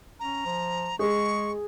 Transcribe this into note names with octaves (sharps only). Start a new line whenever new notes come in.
C#4 A#5
F3
G#3 G#4 C#6